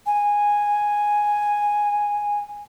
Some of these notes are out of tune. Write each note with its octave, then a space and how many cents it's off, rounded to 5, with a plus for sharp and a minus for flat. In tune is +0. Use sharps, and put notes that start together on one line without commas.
G#5 -5